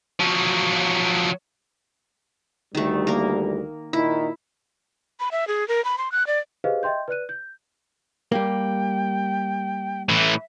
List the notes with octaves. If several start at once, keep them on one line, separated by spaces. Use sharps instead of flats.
F3 F#3
D2 D#3 E3 G3 A3
A#3 A#4
A#2 D#3 D#4 E4
B5
E5
G#4
A#4
B5
C6
F#6
D5
G4 G#4 B4 C5 D#5 F5
D#5 E5 G5 C6 G6
B4 D5 F#6 D#7
G6
G3 A#3 G5
A2 E3 E5